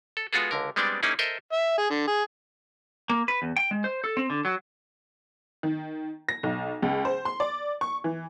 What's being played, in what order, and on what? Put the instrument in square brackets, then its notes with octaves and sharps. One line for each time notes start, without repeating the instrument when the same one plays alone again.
[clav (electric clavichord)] A4
G#3 B3 F4 F#4 G#4 A4
C#2 D3 A#4
G3 G#3 B3 C4 D4 D5
A#3 C#4 D#4 E4 G#4
A4 A#4 C5 D#5 E5
[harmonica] E5
G#4
D3
G#4
[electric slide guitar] A#3
B4
E2
G5
G#3
C5
A4
C4
D3
F#3
[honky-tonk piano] D#3
A#6
B1
C#2
C5
C6
D5
C#6
E3